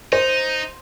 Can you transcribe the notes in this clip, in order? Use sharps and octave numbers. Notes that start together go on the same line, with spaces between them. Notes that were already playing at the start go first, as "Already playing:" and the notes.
D#4 C5